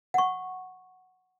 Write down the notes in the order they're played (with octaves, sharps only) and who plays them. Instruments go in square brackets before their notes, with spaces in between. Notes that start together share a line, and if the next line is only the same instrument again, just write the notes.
[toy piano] F#5 C#6